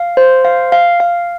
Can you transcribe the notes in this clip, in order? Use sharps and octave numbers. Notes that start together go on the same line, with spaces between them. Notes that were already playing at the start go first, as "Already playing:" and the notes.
Already playing: F5
C5
F5
F5
F5